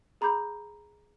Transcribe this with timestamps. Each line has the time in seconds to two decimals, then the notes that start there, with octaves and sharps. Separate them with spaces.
0.21 G#4 A#5 B5 D6 G6